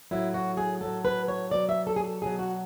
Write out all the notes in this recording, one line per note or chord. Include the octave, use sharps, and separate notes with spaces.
A2 F#3 E4
F#4
G#4
A2 F#3 A4
B4
C#5
B2 F#3 D5
E5
A4
G#4
A4
B2 F#3 G#4
F#4